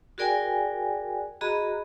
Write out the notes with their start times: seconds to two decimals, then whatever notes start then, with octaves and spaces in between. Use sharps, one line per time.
0.18 F#4 G#4 A#4 D5 G5 G#5
1.41 F#4 G#4 D#5 A#5 B5